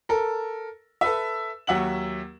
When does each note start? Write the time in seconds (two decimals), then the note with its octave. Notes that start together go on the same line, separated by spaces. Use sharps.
0.09 A4 A#4
1.01 A4 B4 E5
1.67 D#2 F#3 E5 F#5 F#7